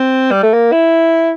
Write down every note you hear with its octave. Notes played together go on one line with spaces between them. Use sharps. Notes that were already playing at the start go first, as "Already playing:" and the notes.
Already playing: C4
G3
A3
A#3
E4